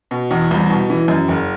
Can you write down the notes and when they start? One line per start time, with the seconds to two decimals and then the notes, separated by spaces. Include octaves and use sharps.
0.11 B2
0.31 E2
0.51 C2
0.70 B2
0.90 E3
1.08 F#2
1.28 F#1